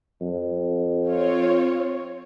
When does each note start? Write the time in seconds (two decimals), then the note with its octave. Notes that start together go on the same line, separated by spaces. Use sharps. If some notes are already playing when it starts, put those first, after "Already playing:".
0.21 F2
1.06 C4 F4 C#5